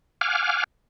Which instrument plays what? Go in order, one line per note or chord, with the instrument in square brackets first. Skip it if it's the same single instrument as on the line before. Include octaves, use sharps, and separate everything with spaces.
[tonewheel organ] F5 F#5 G#5 D6 F6